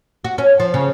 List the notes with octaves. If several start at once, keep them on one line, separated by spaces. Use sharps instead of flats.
F#4
C#4
F3
C#3